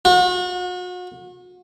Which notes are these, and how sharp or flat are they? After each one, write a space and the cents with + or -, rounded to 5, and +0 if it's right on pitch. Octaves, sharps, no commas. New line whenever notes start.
F#4 -40